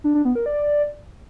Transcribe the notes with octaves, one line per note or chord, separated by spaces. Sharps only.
D4
D4
B3
A#4
D5